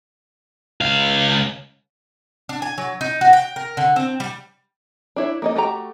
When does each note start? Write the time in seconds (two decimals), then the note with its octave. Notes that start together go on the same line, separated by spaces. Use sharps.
0.81 C#2 F5
2.49 D4
2.62 G#5
2.78 F#3
3.01 D#4
3.21 F#4
3.33 G5
3.56 A#4
3.77 D3
3.96 C4
4.20 G3
5.16 D4 E4 C#5
5.42 A#3 D#4 D#5
5.56 A3 F#4 G4 A#5